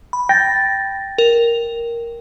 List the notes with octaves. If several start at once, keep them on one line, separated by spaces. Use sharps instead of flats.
B5
G5 A6 A#6
A#4